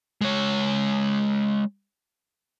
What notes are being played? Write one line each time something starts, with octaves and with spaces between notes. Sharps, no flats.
G#3 C#5